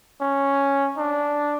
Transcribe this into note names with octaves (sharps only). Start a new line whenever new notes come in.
C#4
D4